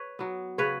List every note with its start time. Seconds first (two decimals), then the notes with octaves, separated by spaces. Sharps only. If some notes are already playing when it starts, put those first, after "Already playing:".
Already playing: B4 C#5
0.19 F#3 B3
0.58 C#3 B4 C#5